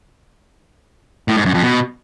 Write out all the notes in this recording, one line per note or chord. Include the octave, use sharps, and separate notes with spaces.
A2
G#2
F#2
F2
B2